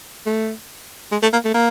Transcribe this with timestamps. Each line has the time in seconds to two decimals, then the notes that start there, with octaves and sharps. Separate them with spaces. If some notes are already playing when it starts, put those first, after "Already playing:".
0.26 A3
1.12 G#3
1.22 A3
1.33 A#3
1.45 A3
1.54 A#3